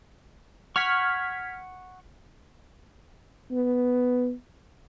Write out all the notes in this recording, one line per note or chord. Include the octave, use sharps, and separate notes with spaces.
F#5 C#6 F6 G#6 B6
B3